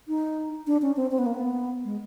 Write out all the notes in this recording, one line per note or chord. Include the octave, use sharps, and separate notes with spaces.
D#4
D4
C#4
C4
C4
B3
A#3
B3
G#3